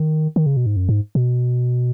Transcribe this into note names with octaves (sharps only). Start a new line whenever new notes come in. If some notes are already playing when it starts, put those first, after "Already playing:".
Already playing: D#3
D#3
C#3
B2
G#2
F#2
G#2
B2